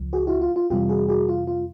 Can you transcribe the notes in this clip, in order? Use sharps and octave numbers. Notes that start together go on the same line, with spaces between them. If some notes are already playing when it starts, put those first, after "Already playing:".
Already playing: C#2 C#3 F3
F#4 G#4
E4 F#4
F4
F4
F2 C3 E3 G3 F4 G4
F#4 G#4
F#4 G#4
F4
F4